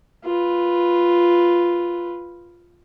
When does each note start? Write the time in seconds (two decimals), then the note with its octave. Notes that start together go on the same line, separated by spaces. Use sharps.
0.24 F4 B4